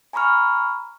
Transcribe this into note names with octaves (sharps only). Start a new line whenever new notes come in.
G#5 A#5 B5 C#6 F6